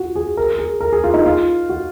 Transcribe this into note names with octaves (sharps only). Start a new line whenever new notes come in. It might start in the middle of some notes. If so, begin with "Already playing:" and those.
Already playing: F4 F#4
G#4
A#4
G#4
A#4
G#4
F4
D#4
F4
F#4